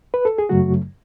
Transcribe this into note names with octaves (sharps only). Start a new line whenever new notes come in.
B4
A4
G#4
F#2 C#3 F#3 A3 F#4